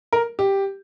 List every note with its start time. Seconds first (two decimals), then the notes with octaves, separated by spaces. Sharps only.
0.13 A#4
0.39 G4